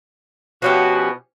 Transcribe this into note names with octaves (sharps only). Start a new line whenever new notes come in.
B2 F3 C#4 F#4 G4